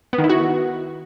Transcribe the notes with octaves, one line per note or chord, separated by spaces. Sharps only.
B3
D#3
E4
F#4